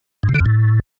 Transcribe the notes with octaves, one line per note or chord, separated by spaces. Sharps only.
G#2
C3
D3
F2
A2